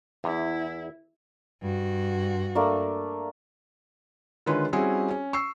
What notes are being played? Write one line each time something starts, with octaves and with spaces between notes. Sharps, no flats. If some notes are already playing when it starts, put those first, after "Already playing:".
E2 E4
G2 F#4
A3 A#3 D4
D3 D#3 G#3 F4 B4 C#5
G3 C4 C#4 E4 F#4 G#4
C#4
C#6 E6 C7